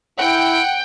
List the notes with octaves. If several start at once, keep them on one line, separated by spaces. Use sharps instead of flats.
E4 F#5 G5